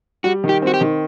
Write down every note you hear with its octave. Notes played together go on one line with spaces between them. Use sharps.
G3 F#4
D#3
G4
C4 F#4
G4
D#3